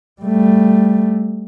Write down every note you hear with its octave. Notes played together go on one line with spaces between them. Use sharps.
G3 A3